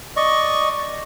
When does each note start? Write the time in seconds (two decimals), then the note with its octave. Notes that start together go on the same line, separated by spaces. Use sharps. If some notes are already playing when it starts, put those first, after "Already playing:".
0.17 D5 D#5 C#6